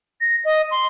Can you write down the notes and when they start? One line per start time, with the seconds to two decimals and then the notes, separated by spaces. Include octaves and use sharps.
0.21 A#6
0.45 D#5
0.71 C6